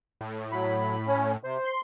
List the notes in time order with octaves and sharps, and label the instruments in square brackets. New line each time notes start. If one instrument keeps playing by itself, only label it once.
[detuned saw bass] A2
[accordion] F#3 [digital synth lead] B5
[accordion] C#4
[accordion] C3 [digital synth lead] C5
[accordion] C6